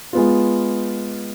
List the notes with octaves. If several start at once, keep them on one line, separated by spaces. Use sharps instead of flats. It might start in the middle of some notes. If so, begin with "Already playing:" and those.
G#3 B3 F4